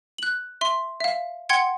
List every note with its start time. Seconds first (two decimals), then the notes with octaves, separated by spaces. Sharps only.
0.18 F#6 F#7
0.61 E5 C6
1.00 E5 F5
1.49 F#5 G5 C6 G#6 C#7